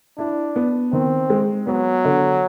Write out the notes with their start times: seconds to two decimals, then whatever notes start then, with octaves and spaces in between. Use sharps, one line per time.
0.18 D4 E4
0.56 B3
0.92 D#3 C4
1.30 G#3
1.67 F#3 B3
2.05 D3